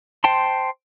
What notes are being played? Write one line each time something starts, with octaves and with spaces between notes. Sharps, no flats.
C5 G5 A5 C6